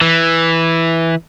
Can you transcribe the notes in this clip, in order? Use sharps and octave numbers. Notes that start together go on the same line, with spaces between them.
E3